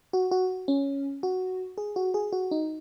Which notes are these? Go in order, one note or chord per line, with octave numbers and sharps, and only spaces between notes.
F#4
F#4
C#4
F#4
G#4
F#4
G#4
F#4
D#4